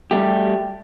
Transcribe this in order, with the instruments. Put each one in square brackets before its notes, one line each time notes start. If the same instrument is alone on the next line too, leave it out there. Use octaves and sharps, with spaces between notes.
[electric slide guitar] G3 A3 G4